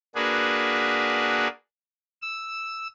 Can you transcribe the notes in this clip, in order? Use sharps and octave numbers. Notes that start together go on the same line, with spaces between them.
A#3 D4 F#4 G#4 B4
E6